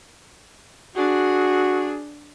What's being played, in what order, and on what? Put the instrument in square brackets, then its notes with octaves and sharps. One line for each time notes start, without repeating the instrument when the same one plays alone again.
[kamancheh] D4 G#4 [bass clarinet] F#4